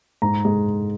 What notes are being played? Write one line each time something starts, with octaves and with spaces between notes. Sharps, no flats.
G#2 A#5
G#3